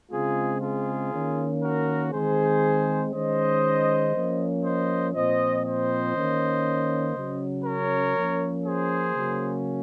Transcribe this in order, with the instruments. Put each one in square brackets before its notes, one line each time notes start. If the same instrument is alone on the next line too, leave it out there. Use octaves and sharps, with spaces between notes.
[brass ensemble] C#3 G#3 C4 F4 G#4
F4 G#4
D#3 A#3 C#4
F#4 A#4
D#3 G#3 C4 G#4 C5
D#3 G#3 C#4 C5 D#5
F3 A#3 C#4
C5 D#5
A#2 F3 C4 C5 D#5
C5 D#5
D#3 A#3 C#4
C#3 F#3 C#4
A#4 C#5
F3 A#3 C#4
G#4 C5
C#3 F#3 A#3 C#4